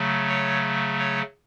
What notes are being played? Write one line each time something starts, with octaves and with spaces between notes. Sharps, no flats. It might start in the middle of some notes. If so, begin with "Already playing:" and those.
Already playing: C#3 F#3 A3
C#5
C#5